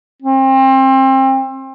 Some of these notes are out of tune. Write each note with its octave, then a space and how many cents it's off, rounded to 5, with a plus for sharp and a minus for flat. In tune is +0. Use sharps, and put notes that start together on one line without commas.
C4 +30